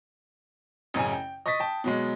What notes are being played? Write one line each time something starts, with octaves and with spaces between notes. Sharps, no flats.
A1 F#2 C#3 G#5
G5
D#5 C#6 D#6 A6 B6
G5 A5
B2 F#3 G#3